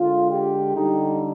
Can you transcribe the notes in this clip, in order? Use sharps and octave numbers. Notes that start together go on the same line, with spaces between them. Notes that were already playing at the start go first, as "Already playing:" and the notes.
Already playing: D3 G#3 F4
G4
D3 G3 D#4